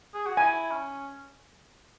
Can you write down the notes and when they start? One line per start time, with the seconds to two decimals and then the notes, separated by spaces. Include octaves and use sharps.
0.14 G#4
0.26 F#4
0.37 E4 G#5
0.71 C#4